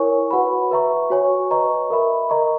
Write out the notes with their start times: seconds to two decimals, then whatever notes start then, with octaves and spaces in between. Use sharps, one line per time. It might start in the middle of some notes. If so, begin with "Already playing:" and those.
Already playing: E4 A#4 C#5 G#5 C#6
0.31 F#4 B4 F#5 B5
0.71 B4 E5 A#5 C#6
1.10 F#4 C#5 G#5 C#6
1.51 B4 D#5 A#5 C#6
1.90 A#4 E5 B5
2.30 A#4 D#5 A#5 C#6